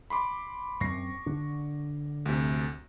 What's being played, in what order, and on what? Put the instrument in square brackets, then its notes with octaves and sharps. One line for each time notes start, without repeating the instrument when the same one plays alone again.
[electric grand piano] B5 C6 D6
[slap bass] F#2 C4 [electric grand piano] C#6 A#6 C7
[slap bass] D3 D4
[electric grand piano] D2 C3